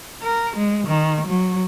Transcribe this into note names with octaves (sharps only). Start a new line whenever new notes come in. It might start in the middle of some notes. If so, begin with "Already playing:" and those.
A#4
G#3
D#3
F#3